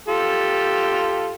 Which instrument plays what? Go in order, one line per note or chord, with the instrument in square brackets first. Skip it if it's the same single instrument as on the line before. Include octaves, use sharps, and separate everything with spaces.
[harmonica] F4 G4 A4